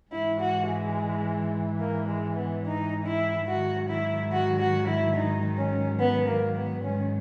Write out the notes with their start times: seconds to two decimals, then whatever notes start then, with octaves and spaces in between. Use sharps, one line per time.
0.11 G#2 E3 E4
0.40 F#4
0.68 G#3
1.80 A#3
2.07 G#3
2.35 B3
2.64 D#4
3.05 E4
3.48 G#2 D#3 F#3 F#4
3.89 E4
4.32 F#4
4.60 F#4
4.87 E4
5.16 D#4
5.58 C#4
5.99 B3
6.27 A#3
6.56 B3
6.83 G#2 D#3 F#3 C#4